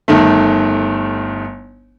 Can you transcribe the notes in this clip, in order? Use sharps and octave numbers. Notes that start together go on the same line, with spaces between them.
G1 D#3 A3